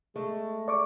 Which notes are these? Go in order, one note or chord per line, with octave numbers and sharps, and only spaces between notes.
G#3 A3
D5 C#6 D6